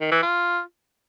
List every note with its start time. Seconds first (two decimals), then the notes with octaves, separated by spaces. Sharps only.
0.01 D#3
0.12 E3
0.23 F4